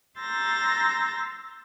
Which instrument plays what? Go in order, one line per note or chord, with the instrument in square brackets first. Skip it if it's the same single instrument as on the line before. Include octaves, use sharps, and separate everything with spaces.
[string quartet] A#5 C6 E6 G6 A6 A#6